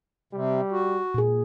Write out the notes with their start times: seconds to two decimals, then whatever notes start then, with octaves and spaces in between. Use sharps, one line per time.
0.33 C3 G3
0.71 F#4
1.14 A#2 G#4